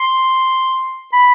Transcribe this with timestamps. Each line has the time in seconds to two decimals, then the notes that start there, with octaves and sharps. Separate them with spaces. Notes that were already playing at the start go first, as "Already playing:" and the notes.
Already playing: C6
1.13 B5